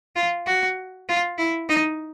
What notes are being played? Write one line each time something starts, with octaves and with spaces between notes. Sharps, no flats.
F4
F#4
F4
E4
D#4